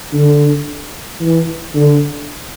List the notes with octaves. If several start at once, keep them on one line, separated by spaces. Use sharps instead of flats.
D3
E3
D3